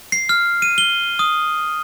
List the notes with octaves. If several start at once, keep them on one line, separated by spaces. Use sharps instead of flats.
C7
F6
D#7
G7
D#6